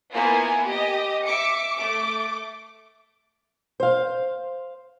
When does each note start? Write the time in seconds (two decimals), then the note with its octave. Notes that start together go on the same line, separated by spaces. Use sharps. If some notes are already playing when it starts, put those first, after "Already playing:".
0.12 A#3 B3 E4 F4 G#5
0.65 G4 D#5
1.25 E5 D6 C#7
1.76 A3 D6
3.80 C5 F5